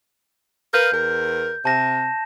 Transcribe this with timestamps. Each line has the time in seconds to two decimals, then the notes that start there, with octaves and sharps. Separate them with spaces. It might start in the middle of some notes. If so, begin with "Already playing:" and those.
0.74 A#4 B4 F5 G6
0.92 E2 A#4
1.65 C3 A5 A#6 E7